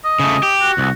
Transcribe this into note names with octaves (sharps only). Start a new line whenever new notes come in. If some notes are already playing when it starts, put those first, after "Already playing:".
D#5
C#3 A3
G4
F#4
C2